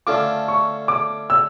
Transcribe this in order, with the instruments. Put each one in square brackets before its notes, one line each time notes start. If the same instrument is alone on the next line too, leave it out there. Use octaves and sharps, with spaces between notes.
[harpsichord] D3 A3 C#4 F4 [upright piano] D6
[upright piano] C#6
D6
E6